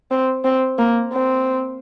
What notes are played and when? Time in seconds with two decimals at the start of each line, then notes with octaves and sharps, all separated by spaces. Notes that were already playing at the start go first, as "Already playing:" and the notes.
0.11 C4
0.45 C4
0.78 A#3
1.13 C4